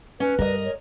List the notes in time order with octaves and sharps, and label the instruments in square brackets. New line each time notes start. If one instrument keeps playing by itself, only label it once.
[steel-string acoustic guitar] C#4 [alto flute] B4
[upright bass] G2 G3 [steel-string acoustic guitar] A#4 D#5
[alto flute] C#5